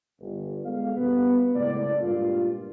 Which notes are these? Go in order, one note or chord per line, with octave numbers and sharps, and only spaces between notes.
G1
G#3 B3 A4 F5
E2 G2 C3 G3 B3
F#1 A2 C#3 G#3 A3 D5
G2 A#2 G3 G#3 A#3 F4